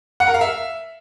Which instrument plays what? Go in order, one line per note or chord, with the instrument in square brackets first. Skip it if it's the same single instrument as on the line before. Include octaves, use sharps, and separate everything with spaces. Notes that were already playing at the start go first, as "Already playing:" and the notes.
[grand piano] F#5
A#4
F5
E5